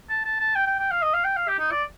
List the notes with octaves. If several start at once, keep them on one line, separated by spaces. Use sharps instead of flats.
A5
A5
A5
G5
G5
G5
F5
D#5
F5
G5
F5
G4
D#4
D5